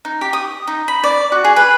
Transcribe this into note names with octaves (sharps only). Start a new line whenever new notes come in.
D#4
G4
D#6
D#4
B5
D5
F#4
G#4
B4